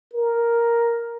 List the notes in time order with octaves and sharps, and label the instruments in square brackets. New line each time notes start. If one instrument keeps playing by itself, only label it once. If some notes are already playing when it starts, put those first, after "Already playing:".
[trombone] A#4